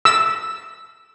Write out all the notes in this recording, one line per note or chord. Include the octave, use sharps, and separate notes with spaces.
E6